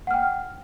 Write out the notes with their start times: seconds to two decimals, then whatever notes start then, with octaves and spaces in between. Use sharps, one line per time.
0.07 F#5
0.11 F6
0.14 G5